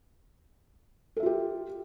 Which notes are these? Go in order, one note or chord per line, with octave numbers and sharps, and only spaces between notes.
F4 G4 A4 E5